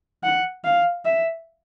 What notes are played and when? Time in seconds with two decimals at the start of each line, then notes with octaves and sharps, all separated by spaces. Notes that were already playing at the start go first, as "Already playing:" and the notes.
0.23 F#5
0.64 F5
1.05 E5